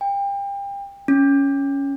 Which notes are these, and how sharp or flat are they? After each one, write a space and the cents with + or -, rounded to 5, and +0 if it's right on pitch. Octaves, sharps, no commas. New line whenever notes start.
G5 +30
C#4 +5